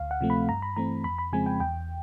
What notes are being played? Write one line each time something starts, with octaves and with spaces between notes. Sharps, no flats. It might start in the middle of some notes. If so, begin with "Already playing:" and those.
Already playing: D2 F5
F#5
C3 F3 A3 C4
B5
G2 A#5
B5
E3 A3 C4 A#5
F2 B5
B5
C#3 F3 G#3 C4 G#5
G5
E2 G5